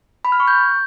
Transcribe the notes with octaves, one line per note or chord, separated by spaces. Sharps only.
B5
F6
C#6
G6